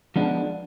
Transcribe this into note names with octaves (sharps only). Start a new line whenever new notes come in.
F3 G#3 B3 D4